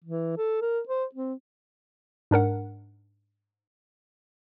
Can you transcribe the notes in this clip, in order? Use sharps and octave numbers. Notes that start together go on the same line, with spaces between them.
E3
A4
A#4
C5
C4
G#2 D4 A#4 F#5